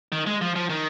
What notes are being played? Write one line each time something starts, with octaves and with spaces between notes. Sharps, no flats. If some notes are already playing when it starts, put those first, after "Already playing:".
D#3
G#3
F3
F3
D#3